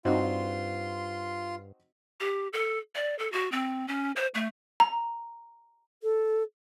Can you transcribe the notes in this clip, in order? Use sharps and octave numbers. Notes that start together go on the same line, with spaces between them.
G2 C4 D#4 F4 F#4 C6
G4
A4
D5
A4
F#4
C4
C#4
C5
A3
A#5
A4